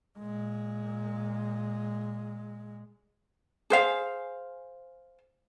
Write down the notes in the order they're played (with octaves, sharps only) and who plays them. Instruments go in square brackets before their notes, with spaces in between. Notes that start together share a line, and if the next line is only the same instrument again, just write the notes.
[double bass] A#2 G#3
[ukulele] G#4 C5 F5